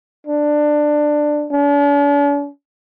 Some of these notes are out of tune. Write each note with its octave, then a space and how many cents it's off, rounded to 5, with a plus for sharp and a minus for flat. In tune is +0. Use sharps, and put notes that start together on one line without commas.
D4 +15
D4 -45